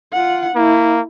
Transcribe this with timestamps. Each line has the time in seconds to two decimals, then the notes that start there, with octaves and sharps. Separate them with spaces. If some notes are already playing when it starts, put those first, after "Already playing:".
0.13 F4 F#5
0.55 A#3 E4